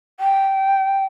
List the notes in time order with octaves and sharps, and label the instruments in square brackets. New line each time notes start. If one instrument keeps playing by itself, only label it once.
[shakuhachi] G5